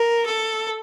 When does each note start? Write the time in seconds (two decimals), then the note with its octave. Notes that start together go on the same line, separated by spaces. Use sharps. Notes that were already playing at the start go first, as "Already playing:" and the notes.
Already playing: A#4
0.25 A4